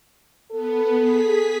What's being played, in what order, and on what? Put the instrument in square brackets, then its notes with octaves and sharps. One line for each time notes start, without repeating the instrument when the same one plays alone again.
[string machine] B3 [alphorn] A4
[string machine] G#4 B6